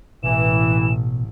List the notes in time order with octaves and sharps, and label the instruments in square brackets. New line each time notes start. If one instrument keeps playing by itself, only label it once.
[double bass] A1 [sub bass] B2 [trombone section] E3 [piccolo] E7